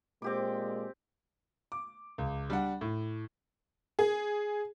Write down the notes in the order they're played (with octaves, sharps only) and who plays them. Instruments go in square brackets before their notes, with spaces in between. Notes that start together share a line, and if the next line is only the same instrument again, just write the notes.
[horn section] A#2 G#3 [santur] C4 G4 D6
[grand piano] D6
C#2
G3 D4 F#5
A2
[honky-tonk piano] G#4